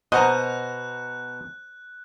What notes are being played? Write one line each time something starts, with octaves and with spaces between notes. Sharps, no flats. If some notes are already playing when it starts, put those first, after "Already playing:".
B2 C5 D#5 F#5 A#5 F#6